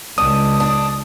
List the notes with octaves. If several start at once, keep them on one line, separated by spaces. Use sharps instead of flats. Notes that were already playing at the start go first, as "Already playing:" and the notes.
C#2 D4 D#6
D4